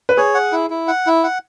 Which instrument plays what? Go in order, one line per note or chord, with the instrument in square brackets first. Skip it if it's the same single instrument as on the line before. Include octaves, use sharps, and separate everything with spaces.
[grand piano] B4
[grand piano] G#4 [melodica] C#5
[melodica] F#5
E4
E4
F#5
E4
F#5